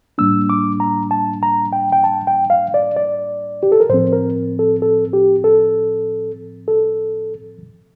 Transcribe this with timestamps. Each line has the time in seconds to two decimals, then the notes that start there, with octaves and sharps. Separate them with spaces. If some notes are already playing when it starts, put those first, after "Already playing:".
0.18 A2 G3 A#3 D4 E6
0.50 D6
0.80 A#5
1.11 A5
1.43 A#5
1.73 G5
1.92 G5
2.04 A5
2.27 G5
2.50 F5
2.74 D5
2.96 D5
3.63 G4
3.72 A4
3.80 A#4
3.89 A2 F3 C4 C5
4.13 A#4
4.59 A4
4.82 A4
5.13 G4
5.44 A4
6.68 A4